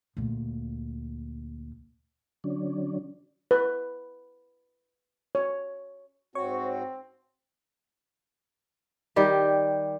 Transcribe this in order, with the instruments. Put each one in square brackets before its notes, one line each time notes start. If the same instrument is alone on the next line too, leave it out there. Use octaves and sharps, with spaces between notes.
[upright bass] D2 A#2
[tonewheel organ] D3 F#3 C#4 D4
[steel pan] B4
C#5
[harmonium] G#2 F#4 [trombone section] C4 [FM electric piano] C#5 C#6
[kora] D#3 G3 G4